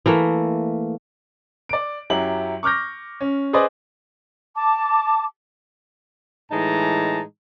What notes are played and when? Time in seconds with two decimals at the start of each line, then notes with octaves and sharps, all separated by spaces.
0.06 E3 A3 A#3
1.69 D5 D7
2.10 F#2 F#3 E4 G4 F#7
2.63 C#6 D6 F6 G6 A#6
3.21 C#4
3.53 G#4 B4 C5 D5 D#5
4.56 A5 D6
6.51 A2 E3 G#3 D#4 A5 A#5